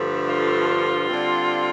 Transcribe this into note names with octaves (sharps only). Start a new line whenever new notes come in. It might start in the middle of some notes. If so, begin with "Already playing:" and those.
Already playing: G2 D3 F3 A3
F4
D3 G3 C4